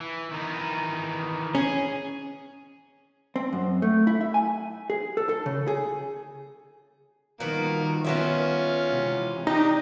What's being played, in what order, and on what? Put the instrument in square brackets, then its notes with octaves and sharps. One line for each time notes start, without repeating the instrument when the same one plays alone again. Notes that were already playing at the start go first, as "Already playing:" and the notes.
[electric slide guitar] E3
D#3 E3 D#4
[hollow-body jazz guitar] C#4 [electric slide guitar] G#4
[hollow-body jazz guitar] C4
F#2
A3
E4
E5
G#5
G#4
A4
A4
C#3
G#4
[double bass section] D#3 F3 G3 [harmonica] A#3 [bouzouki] B3 F#4
[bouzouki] B3 F#4 E5 [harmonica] C#4 F4
[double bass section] C3 E3 G#3
[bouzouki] D4 [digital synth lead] D#4 [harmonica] G4